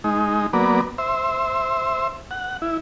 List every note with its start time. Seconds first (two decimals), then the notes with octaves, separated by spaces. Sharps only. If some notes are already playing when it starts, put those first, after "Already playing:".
0.04 G#3 D#4
0.53 F#3 A#3 B3 D5
0.98 C5 E5
2.31 F#5
2.62 E4